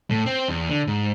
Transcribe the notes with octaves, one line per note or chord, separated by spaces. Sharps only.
A2
C4
E2
D3
G#2